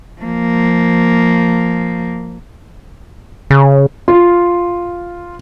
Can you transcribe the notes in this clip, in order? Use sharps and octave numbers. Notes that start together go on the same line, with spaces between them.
F3 A#3
C#3
F4